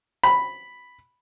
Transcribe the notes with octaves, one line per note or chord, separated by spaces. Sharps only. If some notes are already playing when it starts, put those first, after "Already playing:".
B5